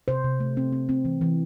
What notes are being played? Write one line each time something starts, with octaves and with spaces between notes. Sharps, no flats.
C3 C5
C3
A3
C4
C4
C4
E3
E3